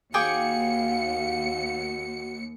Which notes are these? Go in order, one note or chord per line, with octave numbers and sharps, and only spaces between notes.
D#2 F#4 G#4 F5 G5 D6 C#7